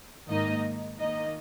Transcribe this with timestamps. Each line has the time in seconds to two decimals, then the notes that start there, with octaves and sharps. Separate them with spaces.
0.28 G#2 D#3 A#3 D#4 D#5
0.99 D#3 A#3 D#4 D#5